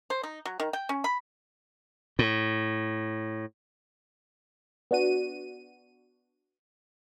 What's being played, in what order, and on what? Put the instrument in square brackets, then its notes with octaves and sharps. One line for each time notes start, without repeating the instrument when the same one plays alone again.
[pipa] C5
D#4
F#3
D#3
G5
C#4
B5
[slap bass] A2
[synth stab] B3 D4 F#4 D#7